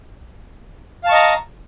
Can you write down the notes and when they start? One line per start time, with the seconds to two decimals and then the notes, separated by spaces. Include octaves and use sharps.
1.03 F5
1.06 A5
1.09 C#6
1.12 D#5
1.15 A#5